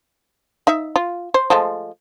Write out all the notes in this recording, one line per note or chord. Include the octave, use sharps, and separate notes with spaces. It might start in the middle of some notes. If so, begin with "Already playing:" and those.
D#4 E5
F4
C5
F3 G#3 A3